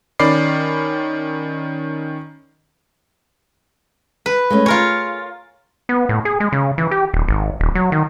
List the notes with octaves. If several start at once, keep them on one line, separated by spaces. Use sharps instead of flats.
D#3 C#4 D5 B5 D6 C7
B4
G#3 A3 C#4
F4 G#4 A#4 C#5
B3
A2
G#4
G#3
C#3
E3
G4
D#1
G#1
D#1
F#3
D#3